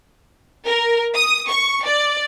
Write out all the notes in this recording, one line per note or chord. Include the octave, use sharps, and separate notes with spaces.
A#4
D#6
C#6
D5